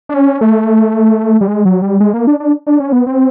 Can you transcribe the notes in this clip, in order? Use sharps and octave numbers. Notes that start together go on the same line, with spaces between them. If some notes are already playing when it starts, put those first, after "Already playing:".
D4
C#4
A3
G3
G#3
F#3
G3
G#3
A#3
D4
D4
D4
C#4
B3
C4